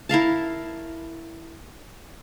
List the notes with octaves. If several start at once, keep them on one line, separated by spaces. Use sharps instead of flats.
E4 A#4 F5 A5